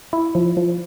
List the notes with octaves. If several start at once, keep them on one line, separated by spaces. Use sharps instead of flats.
E4
F3
F3